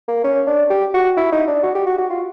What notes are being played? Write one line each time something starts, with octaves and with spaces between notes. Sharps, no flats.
A#3
C#4
D4
G4
F#4
E4
D#4
D4
F#4
G4
F#4
F#4
F4